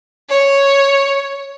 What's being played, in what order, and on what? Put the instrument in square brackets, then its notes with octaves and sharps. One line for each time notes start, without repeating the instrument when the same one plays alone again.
[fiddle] C#5